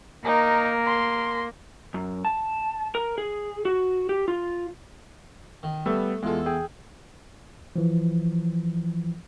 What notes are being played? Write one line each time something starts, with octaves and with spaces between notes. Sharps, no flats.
A#3 D#4 A#4
C6
F#2
A5
A#4
G#4
F#4
G4
F4
D#3
G3 A3 B3 E6
E2 G#3 F4 A4
G#4 G5
E3 F3